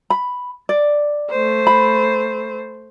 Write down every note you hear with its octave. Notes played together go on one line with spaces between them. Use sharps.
B5
D5
A3 C5
B5